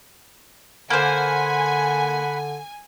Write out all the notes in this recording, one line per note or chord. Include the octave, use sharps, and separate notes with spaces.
D3 A#3 C5 F#5 G#5 B5